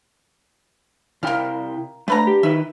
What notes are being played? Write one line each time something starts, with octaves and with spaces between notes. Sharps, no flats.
C3 E4 A#4 F5 G5
D3 A3 B4 A#5
G4
D#3 D#4 B4 E5